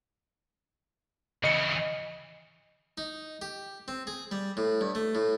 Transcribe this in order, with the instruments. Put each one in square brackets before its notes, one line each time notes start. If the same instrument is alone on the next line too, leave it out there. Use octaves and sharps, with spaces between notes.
[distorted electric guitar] C#3 E3 [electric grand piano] D#5 C#7
[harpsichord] D#4
G4
C4
G#4
G3
A2
G2
A3
A2